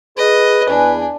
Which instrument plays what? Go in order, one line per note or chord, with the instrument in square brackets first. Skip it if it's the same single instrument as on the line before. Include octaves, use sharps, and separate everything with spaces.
[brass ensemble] G#4 [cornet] B4 [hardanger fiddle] D#5
[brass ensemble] E2 G#5 [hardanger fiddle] D4